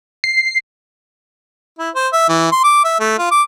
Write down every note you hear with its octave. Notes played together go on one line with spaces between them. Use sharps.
C7
E4
C5
E5
E3
C6
D6
E5
A3
F4
D6